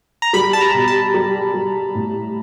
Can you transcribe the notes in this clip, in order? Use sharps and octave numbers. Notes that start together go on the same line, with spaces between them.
A#5
G3 B5
A5
A#5
B2
A5
G3
G3
A2